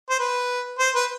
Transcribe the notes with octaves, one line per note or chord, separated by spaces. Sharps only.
C5
B4
C5
B4